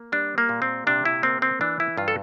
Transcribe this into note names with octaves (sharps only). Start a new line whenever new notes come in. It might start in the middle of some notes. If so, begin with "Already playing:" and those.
Already playing: A#3
G3 D4
A#3
A#2
C4
C3 D4
E4
A#3 C4
C4
E3 D4
E4
G2 F4
A4